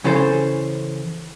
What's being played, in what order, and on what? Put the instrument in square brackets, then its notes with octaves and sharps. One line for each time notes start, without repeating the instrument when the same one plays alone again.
[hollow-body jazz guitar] C#3 E3 C#4 A4 C5